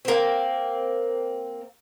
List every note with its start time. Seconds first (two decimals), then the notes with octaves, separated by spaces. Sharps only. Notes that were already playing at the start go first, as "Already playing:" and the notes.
0.05 A#3 C4